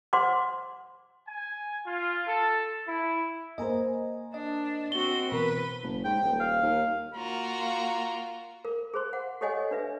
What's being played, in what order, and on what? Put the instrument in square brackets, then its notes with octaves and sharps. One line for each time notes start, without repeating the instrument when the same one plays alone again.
[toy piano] C5 F#5 C6 D6
[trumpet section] G#5
F4
A4
E4
[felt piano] A#3 C5 [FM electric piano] D#5 G#5 A#5
[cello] D4 [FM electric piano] D#5
[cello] C4 F#4 [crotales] G7
[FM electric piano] B2 E3 A#4 [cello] B4
[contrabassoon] F#1
[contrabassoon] G#2 [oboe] G5
[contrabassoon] D#1
[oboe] F5
[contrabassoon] D#2
[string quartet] A#3 F4 F#4 [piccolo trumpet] A#5
[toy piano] A#4
G#4 C5 C6
F#5
G4 A4 C#5 D#5 F#5 G#5
D4 B4 E5